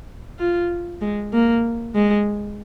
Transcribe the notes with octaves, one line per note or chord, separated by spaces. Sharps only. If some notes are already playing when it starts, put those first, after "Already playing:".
F4
G#3
A#3
G#3